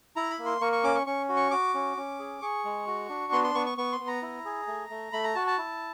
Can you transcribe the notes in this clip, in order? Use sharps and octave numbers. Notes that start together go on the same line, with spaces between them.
E4 A#5
B5
A#3
C6
A#3 C#6
C#6
C#4 D6
C#6
C#4 C#6
F#4
C#6
F#4 D6
C#4
C#4
G#4
G#4 C#6
G#3
F#4
D4
B3 C6
C6
B3 C#6
C#6
B3 C#6
C6
B3
A#5
E4
G#4
A3
A3
A3 B5
A#5
F#4 A5
A5
E4